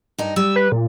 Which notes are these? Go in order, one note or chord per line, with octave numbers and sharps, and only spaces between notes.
G2 D#4
G3 E6
B4
A#2